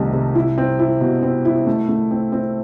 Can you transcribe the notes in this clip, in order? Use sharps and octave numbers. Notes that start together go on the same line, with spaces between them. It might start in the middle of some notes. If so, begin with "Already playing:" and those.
Already playing: C2 C3 D#3 A3
C3
E4
C4
E4
B2
C4
E4
A3
A3
C4
C4